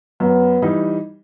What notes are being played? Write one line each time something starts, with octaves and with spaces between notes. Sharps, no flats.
F#2 B3
E3 G3 D#4